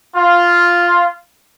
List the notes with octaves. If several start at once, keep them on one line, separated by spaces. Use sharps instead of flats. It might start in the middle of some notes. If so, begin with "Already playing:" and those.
F4